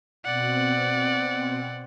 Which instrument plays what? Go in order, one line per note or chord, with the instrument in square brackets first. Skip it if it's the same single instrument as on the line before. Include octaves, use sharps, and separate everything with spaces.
[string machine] B2 C4 [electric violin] D5 F#5